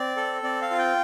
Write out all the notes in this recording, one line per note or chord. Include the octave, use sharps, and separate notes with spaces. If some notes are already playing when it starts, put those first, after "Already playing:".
Already playing: C4 D5
A4
C4 D5
F5
F4
G5